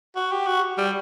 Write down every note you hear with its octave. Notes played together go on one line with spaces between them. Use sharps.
F#4
G4
F#4
G3